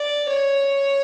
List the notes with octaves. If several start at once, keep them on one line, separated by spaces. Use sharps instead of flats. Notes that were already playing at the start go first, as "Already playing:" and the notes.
Already playing: D5
C#5